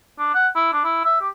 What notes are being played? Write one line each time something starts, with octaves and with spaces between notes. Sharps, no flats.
D4
F#5
E4
D4
E4
E5
G4